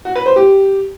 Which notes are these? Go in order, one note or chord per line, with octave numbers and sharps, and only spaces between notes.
F#4
B4
C5
G4